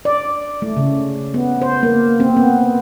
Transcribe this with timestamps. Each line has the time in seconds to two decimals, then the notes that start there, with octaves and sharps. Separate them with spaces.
0.05 D5
0.62 A3
0.77 C#3
1.34 B3
1.62 C5
1.83 A#3
2.20 C4
2.37 B3